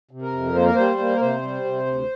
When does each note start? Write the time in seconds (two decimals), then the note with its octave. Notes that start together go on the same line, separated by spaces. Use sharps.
0.11 C3
0.22 A#4
0.33 F2
0.55 A#3 C5
0.65 A#4
0.75 G3 C5
0.99 A#3
1.14 A#4
1.21 C3 C5
1.42 G3
1.64 C3
1.86 D2